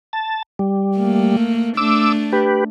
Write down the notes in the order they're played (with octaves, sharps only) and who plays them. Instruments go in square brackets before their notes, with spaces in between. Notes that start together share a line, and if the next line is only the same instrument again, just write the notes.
[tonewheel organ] A5
G3
[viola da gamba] A3 A#3
[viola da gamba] A3 D4 [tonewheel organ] D6 E6
[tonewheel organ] G4 B4